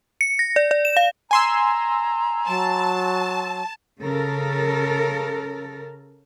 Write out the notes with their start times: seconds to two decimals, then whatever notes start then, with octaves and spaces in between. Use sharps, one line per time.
0.21 C#7
0.39 A#6
0.56 D5
0.71 D5
0.85 E7
0.97 F5
1.31 G#5 A#5 C6 E6
2.47 F#3 A5
4.02 C#3 A4 A#4